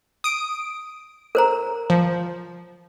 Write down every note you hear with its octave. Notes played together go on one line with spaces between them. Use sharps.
D#6 D7
A#4 C5 A#5
F3